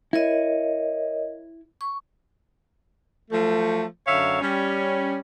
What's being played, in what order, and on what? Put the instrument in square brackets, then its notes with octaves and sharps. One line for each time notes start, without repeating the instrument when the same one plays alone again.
[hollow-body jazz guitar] E4 [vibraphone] A#4 C#5 D#5
[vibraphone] C#6
[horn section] F3 F#3 A3
F#2 D3 C#5 E5 F5
G3 C#4